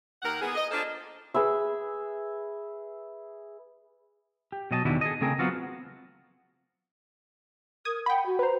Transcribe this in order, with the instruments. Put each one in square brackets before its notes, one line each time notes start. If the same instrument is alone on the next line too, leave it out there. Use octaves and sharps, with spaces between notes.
[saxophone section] D#2 A#4 F#5
E3 B3 G#4
D#5
A#3 D4 F4 G#4 A4 C5
[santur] G#4 B4 E5
[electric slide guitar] G4
B2 F#3 D#5 G#5 A5
E2 B2 D#3 F#3 D4 E4
G#4 A4 D#5
C#3 A3 C4 G#4 A#4
F#3 B3 C4 F4 F#4
[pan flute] A#4 [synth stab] D#6 G#6
[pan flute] F#5 [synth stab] G5 B5
[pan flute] F#4
[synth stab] B4 C5 [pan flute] A#5